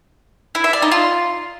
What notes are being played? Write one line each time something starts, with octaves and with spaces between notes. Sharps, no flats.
E4
E5
D5
D#4
F4